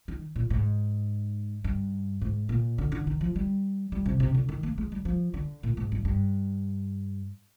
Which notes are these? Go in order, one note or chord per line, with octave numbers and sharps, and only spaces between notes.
D#3
A#2
G#2
G2
G#2
A#2
D3
D3
D#3
F3
G3
G3
C3
C3
D3
D#3
A#3
G#3
G3
F3
D3
A#2
G#2
G2
G2